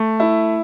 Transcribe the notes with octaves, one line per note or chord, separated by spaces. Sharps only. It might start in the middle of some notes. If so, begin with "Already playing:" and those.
Already playing: A3
E4